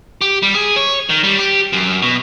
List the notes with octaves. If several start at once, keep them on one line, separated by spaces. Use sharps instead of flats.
G4
G3
G#4
C#5
D#3
G3
G4
F#2
B2